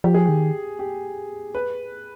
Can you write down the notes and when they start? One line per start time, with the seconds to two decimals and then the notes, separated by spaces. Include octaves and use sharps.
0.04 F3 G4
0.14 G#4
0.25 D#3 G4
0.79 G4
1.55 B4